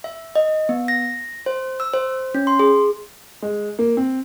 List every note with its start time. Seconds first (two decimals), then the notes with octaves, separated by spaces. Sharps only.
0.04 E5
0.35 D#5
0.69 B3
0.88 A#6
1.46 C5
1.80 E6
1.94 C5
2.34 C#4
2.47 C6
2.59 G#4
3.42 G#3
3.79 A#3
3.97 C4